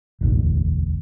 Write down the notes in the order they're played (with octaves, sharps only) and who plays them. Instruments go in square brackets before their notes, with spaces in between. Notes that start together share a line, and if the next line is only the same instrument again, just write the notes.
[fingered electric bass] E1 A1 D2